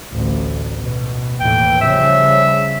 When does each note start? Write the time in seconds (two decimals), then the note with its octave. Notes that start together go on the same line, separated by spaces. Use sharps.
0.11 A1 D2
0.79 B2
1.40 D#2 A2 E3 G5
1.81 C#3 F3 G3 E5